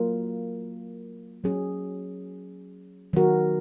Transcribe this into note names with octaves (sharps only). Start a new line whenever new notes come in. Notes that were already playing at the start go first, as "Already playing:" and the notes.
Already playing: F#3 A#3 F4 A#4
F#3 C#4 G#4
D#3 F#3 B3 F#4 A#4